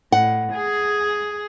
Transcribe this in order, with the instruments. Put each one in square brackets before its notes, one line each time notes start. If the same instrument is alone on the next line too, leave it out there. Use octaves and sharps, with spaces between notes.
[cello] A2 [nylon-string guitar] F#5
[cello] G#4